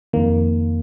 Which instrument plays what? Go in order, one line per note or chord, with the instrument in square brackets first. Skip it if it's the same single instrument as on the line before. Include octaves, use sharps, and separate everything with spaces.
[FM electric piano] F2 D#3 A#3